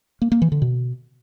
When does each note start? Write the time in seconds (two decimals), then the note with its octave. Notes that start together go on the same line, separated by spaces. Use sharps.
0.22 A#3
0.32 A#3
0.42 E3
0.52 D3
0.62 B2